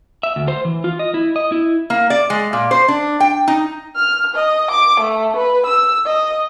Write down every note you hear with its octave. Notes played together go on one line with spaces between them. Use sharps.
E5
D2
C5
E3
F4
D#5
E4
D#5
E4
A#3
D5
G#3
A#2
C5
D4
G5
D#4
F6
D#5
D6
A3
B4
E6
D#5